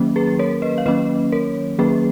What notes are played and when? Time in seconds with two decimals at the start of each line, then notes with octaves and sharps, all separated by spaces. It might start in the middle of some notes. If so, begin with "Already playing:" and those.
Already playing: D#3 F#3 A#3 C#4
0.16 G#4 B4
0.39 A#4 C#5
0.62 B4 D#5
0.78 F5
0.86 D#3 F#3 A#3 C#4 B4 D#5
1.32 A#4 C#5
1.79 D#3 F#3 A#3 C#4 G#4 B4